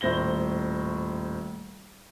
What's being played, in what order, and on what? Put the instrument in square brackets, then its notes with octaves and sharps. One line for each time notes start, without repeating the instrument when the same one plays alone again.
[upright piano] D#1 A2 C5 A#6 G7